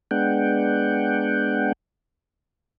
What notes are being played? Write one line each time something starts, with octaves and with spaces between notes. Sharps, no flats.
G#3 B3 D4 F#5 G5